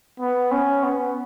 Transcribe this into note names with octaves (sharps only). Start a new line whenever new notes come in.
B3
C#4
B3